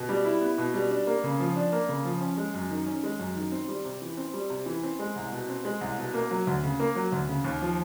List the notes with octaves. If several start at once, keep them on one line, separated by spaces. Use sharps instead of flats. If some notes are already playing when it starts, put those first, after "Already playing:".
Already playing: B2
G3
E4
B3
B2
G3
D4
A#3
C#3
F3
D4
A#3
C#3
F3
C#4
G#3
F#2
D#3
C#4
G#3
F#2
D#3
C4
G3
C3
E3
C4
G3
C3
E3
C4
G#3
C2
B2
C4
G#3
C2
B2
A#3
F#3
D2
C#3
A#3
F#3
D2
C#3
D#2
F3